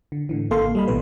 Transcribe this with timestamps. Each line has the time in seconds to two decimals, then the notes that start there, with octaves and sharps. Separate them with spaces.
0.12 D3
0.29 A2 D3 E3
0.50 G#1 C#3 A#3 A4 F5 C6
0.75 G3 D#5 B5
0.88 A#1 B2 E3 B4